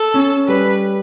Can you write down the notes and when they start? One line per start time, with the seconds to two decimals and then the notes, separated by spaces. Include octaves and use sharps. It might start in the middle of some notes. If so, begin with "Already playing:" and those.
Already playing: A4
0.14 C#4
0.48 G3 B4